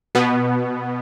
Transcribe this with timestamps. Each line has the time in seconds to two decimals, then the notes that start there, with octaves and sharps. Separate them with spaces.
0.15 B2 B3